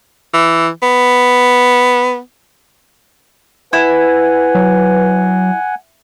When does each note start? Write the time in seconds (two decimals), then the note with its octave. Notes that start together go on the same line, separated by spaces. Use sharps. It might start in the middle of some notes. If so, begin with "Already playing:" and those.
0.34 E3
0.82 B3
3.73 E4 B4 F#5 G#5
4.55 F#3